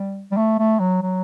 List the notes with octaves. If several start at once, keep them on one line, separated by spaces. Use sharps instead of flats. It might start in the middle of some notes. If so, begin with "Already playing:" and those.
Already playing: G3
G3
A3
A3
F#3
F#3